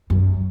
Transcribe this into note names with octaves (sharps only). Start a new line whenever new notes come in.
F#2